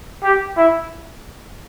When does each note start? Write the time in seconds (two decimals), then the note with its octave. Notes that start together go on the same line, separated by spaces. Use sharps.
0.23 G4
0.57 E4